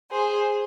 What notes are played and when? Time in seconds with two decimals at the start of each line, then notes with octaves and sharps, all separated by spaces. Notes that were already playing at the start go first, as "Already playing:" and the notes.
0.10 G#4 C5